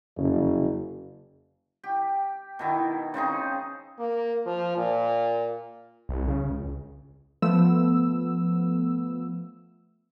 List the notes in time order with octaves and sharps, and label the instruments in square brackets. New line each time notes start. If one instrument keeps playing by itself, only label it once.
[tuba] F#1 [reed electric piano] F2 C#3
[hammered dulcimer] G4
B2 D#3 E4
C#3 C4 D#4 G#4
[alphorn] A#3
F3
A#2
[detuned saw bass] C2
C#3
C#2
[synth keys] F3 A3 B3 E6